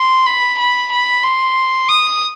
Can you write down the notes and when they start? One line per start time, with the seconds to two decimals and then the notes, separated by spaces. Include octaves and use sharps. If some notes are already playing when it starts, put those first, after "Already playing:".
Already playing: C6
0.26 B5
0.59 B5
0.91 B5
1.23 C6
1.89 D#6